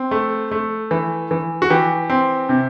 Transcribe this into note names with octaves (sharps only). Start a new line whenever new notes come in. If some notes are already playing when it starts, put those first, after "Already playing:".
Already playing: C4
A3
A3
E3
E3
F#4
E3 G4
C4
C3